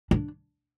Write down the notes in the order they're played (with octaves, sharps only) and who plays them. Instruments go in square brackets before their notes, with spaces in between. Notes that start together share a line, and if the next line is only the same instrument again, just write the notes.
[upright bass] D4